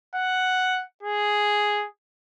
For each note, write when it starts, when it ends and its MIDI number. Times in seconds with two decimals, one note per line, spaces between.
0.15 0.84 78
1.03 1.86 68